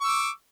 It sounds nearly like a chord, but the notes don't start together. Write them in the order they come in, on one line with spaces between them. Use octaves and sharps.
C#6 E6 D6